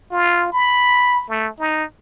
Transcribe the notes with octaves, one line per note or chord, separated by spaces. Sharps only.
F4
B5
A3
D#4